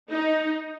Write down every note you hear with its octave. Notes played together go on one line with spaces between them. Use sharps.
D#4